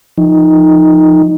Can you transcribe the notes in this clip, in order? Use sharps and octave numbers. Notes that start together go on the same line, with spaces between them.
F3 D#4